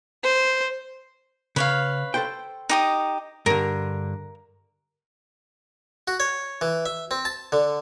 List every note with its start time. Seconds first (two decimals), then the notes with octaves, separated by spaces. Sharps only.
0.23 C5
1.56 C#3 B4 C#5 F5
2.14 A4 C5 G5
2.69 D#4 G4 D#6
3.46 G2 D3 A#4
6.08 F#4
6.20 C#5
6.61 E3
6.86 E5
7.11 C4
7.25 A5
7.52 D3